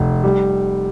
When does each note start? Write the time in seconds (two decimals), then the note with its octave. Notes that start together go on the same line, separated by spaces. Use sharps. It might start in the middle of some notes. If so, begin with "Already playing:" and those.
Already playing: F1
0.24 G3